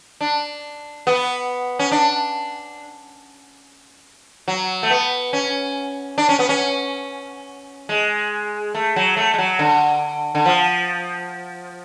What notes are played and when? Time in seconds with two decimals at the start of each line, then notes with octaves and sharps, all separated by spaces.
0.21 D4
1.07 B3
1.79 C#4
1.92 D4
4.48 F#3
4.83 A3
4.90 B3
5.33 C#4
6.18 D4
6.29 C#4
6.39 B3
6.49 C#4
7.89 G#3
8.75 A3
8.96 F#3
9.17 A3
9.34 G#3
9.38 F#3
9.59 D3
10.35 D3
10.46 F3